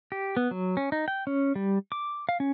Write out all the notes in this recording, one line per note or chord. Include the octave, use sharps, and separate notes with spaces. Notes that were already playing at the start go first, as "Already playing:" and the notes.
G4
B3
F#3
C#4
D#4
G5
C#4
G3
D6
F5
C#4